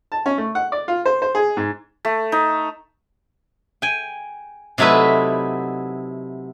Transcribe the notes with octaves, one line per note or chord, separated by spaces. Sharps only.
A5
C#4
A3
F#5
D5
F4
C5
C5
G#4
G#2
A3
D#4
G5 G#5
C3 F#3 A3 D#4 E4 B4